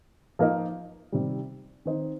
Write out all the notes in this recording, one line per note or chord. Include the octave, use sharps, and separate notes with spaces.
F3 A#3 D#4 A#4 D#5
C3 D#3 G3
D#3 C4 D#4 C5 D#5